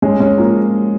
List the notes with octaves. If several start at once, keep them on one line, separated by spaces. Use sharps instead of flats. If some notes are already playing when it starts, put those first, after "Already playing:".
G#3 C#4
G#3 C#4
F3 A#3